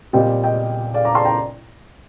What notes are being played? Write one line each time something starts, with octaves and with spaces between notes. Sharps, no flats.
A#2 G3 C4 D#5 G5
D#5 G5
D5 F5
A#5 D6
A5 C6
G5 A#5